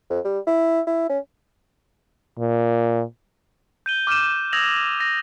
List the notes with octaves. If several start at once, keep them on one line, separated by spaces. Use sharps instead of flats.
F2
G3
E4
E4
C#4
A#2
G6 D#7 G7
D6 F6 G6 D#7 E7
D#6 E6 G#6 A#6 F7 F#7
A#6